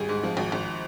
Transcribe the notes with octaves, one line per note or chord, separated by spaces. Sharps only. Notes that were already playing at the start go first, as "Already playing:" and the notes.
Already playing: G#1 G3 G#4
G#2
F3
G#1
G#1